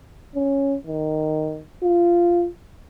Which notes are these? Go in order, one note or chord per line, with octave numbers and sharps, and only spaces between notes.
C#4
D#3
F4